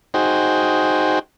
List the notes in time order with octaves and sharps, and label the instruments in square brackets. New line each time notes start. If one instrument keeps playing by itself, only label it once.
[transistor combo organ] D#4 F#4 G#4 C5 G5